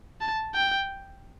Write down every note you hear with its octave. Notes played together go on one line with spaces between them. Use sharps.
A5
G5